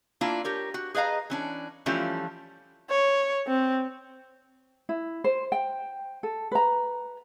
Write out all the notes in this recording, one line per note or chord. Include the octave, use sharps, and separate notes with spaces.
A#3 D4 E4 F4
G4 A#4 C#5
F#4
G#4 B4 D#5 F5 A#5
E3 C#4 D4
E3 F3 G3 A3 C#4 F4
C#5
C4
E4
C5
G5
A4
B4 A#5